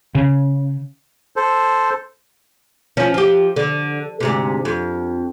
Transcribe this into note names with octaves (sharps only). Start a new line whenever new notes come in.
C#3
A4 C5
F3 C#4
F3 G4
D3
D2 G#2 C3
F2